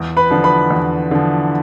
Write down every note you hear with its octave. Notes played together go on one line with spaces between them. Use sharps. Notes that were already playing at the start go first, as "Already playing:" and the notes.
Already playing: E2
B4 B5
D3 F3
B4 B5
E2
D3 F3